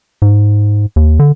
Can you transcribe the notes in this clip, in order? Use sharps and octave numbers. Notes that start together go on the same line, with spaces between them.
G#2
D#2
D3